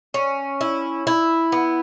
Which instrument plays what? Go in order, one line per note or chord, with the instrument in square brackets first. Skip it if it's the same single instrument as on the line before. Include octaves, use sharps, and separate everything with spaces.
[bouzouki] C#4
E4
E4
B3